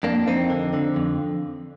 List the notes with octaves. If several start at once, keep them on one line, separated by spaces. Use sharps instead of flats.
F2 A#3 D4
F2 C4 D#4
D3
D3
F2